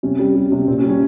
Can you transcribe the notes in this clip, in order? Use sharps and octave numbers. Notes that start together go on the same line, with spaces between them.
C3 C#4
G3
G3
C3
A#2 C4
C#4
G3
C#4